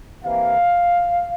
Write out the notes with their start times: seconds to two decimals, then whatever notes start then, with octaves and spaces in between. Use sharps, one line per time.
0.23 C3 E3 A#3 F5